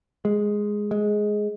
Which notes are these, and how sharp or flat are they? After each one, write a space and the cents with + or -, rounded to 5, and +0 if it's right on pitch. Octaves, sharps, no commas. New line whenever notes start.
G#3 +0
G#3 +10